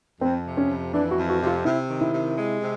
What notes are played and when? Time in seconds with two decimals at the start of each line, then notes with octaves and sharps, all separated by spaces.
0.21 F2 C4
0.45 C3
0.57 C#4
0.69 F2
0.93 E3 D4
1.11 F#4
1.18 F2
1.29 F#4
1.41 C3
1.47 F4
1.65 C3 E4
1.89 D#3
2.01 E4
2.12 C3
2.37 G#3
2.61 C3